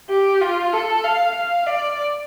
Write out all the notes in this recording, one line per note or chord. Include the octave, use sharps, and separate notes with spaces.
G4
F4
A4
F5
F5
D5